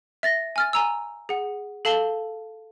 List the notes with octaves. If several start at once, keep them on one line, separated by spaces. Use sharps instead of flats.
E5 A6 A#6
G#5 F6 A6
G#5 A#5 E6
G#4 F#5
A4 F5 A5 F#7 G7